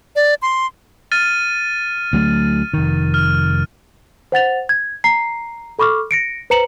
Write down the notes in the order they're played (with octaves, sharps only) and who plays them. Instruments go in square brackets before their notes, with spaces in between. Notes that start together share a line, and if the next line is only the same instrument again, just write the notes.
[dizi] D5
C6
[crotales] F6 A6 D#7
[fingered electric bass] D2 F#3 A3
F1 D#3
[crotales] F6
[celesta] C5 F#5 A6 F7
G#6
A#5 C7
A4 B5 C#6 D6 F6
A#6 C#7 D7
B4 C5 A#5 C#7 E7 F#7